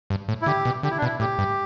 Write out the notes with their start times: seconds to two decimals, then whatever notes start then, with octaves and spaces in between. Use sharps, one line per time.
0.10 G2
0.28 A2
0.42 E4
0.46 D3 G4
0.65 B2
0.83 D3 G4
0.90 E4
0.98 D4
1.02 B2
1.05 E4
1.20 A2 G4
1.38 G2